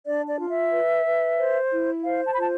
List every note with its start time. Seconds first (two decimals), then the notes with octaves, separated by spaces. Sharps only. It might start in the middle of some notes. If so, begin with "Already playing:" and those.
0.05 D4 D5
0.27 D5
0.39 F4
0.49 E5
0.71 B4
1.05 B4
1.38 C5
1.71 E4
2.04 C5 F5
2.26 A5
2.33 B5
2.37 F4 A5